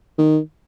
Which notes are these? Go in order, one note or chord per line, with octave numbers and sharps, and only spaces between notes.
D#3